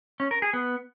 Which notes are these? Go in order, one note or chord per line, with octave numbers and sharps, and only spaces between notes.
C#4
A#4
G#4
B3